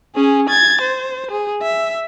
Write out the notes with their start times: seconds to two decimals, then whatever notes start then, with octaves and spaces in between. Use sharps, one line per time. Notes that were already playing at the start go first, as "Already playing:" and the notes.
0.15 C#4 G#4
0.49 G#6 A6
0.81 C5
1.31 G#4
1.62 E5